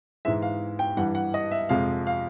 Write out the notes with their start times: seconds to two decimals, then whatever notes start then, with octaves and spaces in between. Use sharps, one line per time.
0.25 G#2 E3 G#3 E5
0.42 F5
0.79 G5
0.97 G2 E3 G3 F#5
1.15 F#5
1.34 D#5
1.51 E5
1.69 F2 C3 F3 G#3 F5
2.07 F5